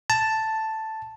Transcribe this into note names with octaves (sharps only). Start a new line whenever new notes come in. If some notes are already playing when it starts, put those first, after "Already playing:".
A5